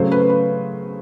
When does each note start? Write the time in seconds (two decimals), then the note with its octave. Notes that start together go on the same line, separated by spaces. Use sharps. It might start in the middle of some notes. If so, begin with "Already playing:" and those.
Already playing: C#3 F#3 A3 C5
0.12 B4
0.29 B4